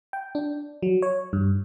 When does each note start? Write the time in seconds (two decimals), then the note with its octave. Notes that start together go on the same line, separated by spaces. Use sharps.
0.13 G5
0.35 D4
0.82 F#3
1.02 C#5
1.33 G2